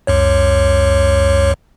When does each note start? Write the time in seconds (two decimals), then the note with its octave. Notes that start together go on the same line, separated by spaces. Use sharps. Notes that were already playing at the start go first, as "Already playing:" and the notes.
0.07 C#2 F#2 C#5